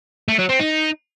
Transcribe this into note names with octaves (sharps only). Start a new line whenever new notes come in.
A3
F#3
C4
D#4